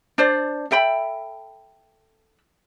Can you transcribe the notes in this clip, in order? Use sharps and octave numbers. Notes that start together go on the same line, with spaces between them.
D4 C5 D5
A4 E5 G5 B5